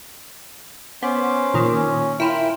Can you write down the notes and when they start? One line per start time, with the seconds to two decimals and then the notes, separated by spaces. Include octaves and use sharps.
1.03 B3 C#4 C5 D6
1.54 A#2 D#3
1.74 C#4
2.20 E4 F4 A#4 G5 B5